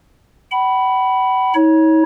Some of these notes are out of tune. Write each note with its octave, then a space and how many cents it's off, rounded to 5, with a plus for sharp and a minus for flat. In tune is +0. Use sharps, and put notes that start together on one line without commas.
F#5 +40 B5 +0
D#4 +45 C#5 +0